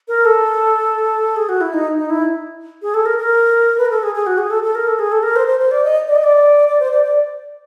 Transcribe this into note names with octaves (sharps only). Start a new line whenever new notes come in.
A#4
A4
G#4
F#4
E4
D#4
D#4
E4
G#4
A4
A#4
A#4
B4
A#4
A4
G#4
G#4
F#4
G#4
A4
A4
A#4
A4
G#4
A4
A#4
C5
C5
C5
D5
D#5
D5
D#5
D5
D5
C5
D5
D5